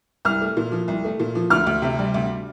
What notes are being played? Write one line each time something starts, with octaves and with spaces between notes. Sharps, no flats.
C2 F6
A3
A#2
F3
C2
A3
A#2
F3
D2 F6
D2
C3
G3
D2